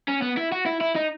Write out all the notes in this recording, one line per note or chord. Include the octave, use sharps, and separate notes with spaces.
C#4
B3
E4
F#4
E4
E4
D#4